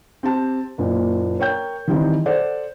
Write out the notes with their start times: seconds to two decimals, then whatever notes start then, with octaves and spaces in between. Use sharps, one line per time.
0.23 C4 G4 A5
0.78 F#1 A#2
1.39 A#4 C#5 G5 G6
1.88 D#3 E3 G3 C4 D#4 E4
2.26 A4 C5 D5 F#5